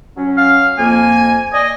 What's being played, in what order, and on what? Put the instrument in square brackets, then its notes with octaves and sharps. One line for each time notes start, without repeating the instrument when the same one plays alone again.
[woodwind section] F#3 C#4
[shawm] F5
[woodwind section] F2 A#3 [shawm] G#5
[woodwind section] D5 G#5 [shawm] D#5